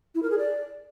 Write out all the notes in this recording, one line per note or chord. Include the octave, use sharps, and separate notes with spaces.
E4
A#4
G#4
D5